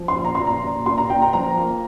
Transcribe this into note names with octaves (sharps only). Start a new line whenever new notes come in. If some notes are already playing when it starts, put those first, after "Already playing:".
Already playing: F3
C6
A#2
A#5
A#2 C6
A#5
A#2
A#2 C6
A#5
A#2 G5
A#5
F3 A#5
A#3